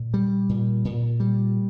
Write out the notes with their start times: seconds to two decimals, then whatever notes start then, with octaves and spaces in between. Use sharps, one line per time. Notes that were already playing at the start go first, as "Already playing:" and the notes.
Already playing: A#2
0.14 G3
0.49 A#2
0.85 A#2
1.20 G3